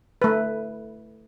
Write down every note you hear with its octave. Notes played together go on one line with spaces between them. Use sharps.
A3 B4